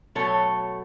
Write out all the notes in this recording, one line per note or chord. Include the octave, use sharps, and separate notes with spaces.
B2 F#3 A3 A4 C#5